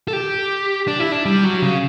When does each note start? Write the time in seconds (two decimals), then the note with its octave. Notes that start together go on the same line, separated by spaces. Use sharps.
0.08 A4
0.13 G4
0.88 D4
1.00 E4
1.12 D4
1.25 G3
1.44 F#3
1.62 C#3